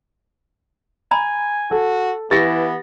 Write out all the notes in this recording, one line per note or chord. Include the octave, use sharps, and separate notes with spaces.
G#5 A#5 B5
F#4 A4
E3 B3 G4 A6 A#6